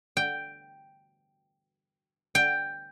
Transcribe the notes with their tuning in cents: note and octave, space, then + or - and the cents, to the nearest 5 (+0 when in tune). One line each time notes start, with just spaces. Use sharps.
G5 +0
G5 +5